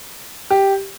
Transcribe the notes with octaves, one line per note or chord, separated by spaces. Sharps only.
G4